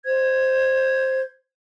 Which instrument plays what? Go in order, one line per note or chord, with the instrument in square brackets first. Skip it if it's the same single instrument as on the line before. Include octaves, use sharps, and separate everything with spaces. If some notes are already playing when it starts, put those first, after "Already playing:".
[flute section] C5 G#6